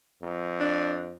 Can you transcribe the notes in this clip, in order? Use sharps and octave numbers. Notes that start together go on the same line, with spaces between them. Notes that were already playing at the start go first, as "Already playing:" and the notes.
F2
D4